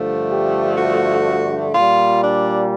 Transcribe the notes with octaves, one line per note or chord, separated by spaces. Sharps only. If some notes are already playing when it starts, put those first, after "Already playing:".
Already playing: G2 D3 F3 A3
G4
F#4
A#2 G3 F4
D4